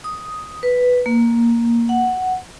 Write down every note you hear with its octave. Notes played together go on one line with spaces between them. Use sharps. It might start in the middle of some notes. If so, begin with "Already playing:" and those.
D#6
B4
A#3
F#5